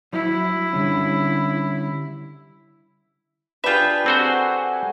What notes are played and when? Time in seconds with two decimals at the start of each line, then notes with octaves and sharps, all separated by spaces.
0.13 F#3 E4
0.73 D3 G3 C#4
3.64 D4 F4 G4 G#4 B4 E5 G5
4.06 C4 F#4 A4 C5 F#5 G#5 C#6